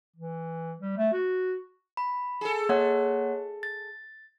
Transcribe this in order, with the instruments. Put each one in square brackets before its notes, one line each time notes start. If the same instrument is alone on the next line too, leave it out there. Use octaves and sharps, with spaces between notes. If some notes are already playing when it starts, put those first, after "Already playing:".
[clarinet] E3
G3
A3
F#4
[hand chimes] B5
[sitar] G#4 A4
[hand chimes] A#3 C#5 F#5
A6